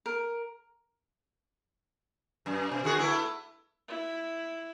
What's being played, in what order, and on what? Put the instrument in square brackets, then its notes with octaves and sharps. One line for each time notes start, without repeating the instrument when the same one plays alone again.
[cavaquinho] A#4
[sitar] F#2
B2
D3 F#4 G#4
A3 B3 E4
[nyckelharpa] E4